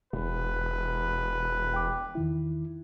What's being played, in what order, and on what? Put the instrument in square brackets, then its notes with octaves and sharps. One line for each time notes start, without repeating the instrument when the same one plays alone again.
[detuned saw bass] E1 [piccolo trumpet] B4
[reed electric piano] G5 D6
E2 D#3 E4